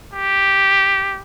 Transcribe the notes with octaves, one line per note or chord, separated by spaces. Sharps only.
G4